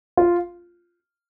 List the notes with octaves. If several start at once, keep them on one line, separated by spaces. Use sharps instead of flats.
F4